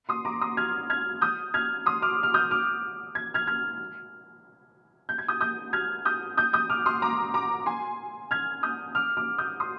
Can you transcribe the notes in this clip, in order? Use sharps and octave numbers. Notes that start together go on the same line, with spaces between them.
C6 D#6
A#5 D6
C6 D#6
F6 G#6
F6 G#6
D#6 G6
F6 G#6
C6 D#6
D6 F6
F6
D#6 G6
D6 F6
G#6
F6 G#6
F6 G#6
G6
G#6
D#6 G6
D#6 G6
F6 G#6
D#6 G6
D#6 G6
D#6 G6
D6 F6
C6 D#6
A#5 D6
A#5 D6
G#5 C6
F6 G#6
D#6 G6
D6 F6
D6 F6
D#6 G6
C6 D#6